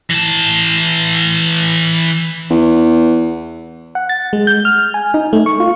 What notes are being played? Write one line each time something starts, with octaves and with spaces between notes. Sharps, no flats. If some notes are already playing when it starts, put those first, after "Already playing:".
E3 A5
E2
F#5
A6
G#3
G6
F6
G#5
D#4
A3
C#6
F4